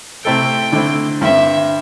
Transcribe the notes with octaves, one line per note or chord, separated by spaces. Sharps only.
C3 A3 C4 E4 A4 G5
D3 A3 C4 E4
G2 D3 C4 E5